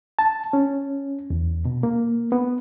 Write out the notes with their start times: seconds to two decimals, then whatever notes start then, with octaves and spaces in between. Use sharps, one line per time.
0.19 A5
0.53 C#4
1.30 E2
1.65 B2
1.83 A#3
2.32 B3